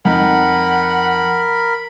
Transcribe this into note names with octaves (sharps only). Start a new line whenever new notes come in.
F2 D#4 A#4 F#5 B5